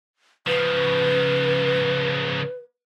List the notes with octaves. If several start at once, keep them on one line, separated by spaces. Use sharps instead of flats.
C#3 F3 B4